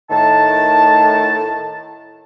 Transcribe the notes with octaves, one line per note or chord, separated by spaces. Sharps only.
A2 D#3 A5